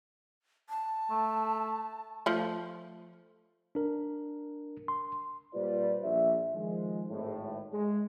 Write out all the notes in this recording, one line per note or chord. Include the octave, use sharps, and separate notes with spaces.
A5
A3
F3 A3
D4 A#4
C6
A#2 G3 F4 B4 C5 D5
A#1 E5
D#3 F3 G#3
G#1 A2
G#3